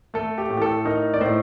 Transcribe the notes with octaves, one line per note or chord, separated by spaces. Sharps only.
A3 A4
G4
A2
G4
A4
D#4 A#4
D5
A2 C5